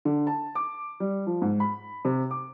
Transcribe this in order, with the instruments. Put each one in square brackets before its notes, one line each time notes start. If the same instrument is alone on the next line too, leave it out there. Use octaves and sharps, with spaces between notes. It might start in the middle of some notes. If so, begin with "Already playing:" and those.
[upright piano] D3
A5
D6
G3
F3
G#2
B5
C3
D6